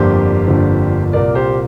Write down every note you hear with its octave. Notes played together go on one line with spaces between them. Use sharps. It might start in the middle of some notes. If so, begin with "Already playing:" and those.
Already playing: G1 F2 D3 F3 A#3 G4 C5
G1 F2 D3 F3 A#3
C2 A#2 A#3 A#4 D5
G4 C5